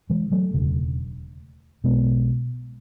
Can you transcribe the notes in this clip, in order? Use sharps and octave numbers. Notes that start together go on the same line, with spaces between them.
E3 G#3
F#3 A3
E1 D2 C#3
B1 B2 G#3 B3